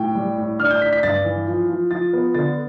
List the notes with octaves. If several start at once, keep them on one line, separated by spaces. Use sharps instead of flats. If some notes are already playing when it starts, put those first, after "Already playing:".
Already playing: A2 G5
G3
A2
D4 F6
G6
D4 B6
B6
G2 A6
E3
F3
F3
F3 A6
B3
D3 A6